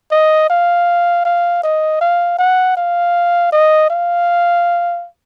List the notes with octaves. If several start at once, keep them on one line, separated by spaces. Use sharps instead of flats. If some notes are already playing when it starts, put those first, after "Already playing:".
D#5
F5
F5
D#5
F5
F#5
F5
D#5
F5